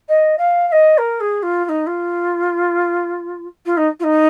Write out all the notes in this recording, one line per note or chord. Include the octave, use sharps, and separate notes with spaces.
D#5
F5
F5
D#5
A#4
G#4
F4
F4
D#4
F4
F4
D#4
F4
D#4